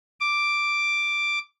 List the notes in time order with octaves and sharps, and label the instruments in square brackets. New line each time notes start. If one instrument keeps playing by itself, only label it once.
[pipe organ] D6